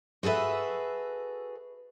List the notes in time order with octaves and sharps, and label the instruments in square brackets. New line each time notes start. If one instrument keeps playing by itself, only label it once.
[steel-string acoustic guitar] F#4 G#4 A4 B4 E5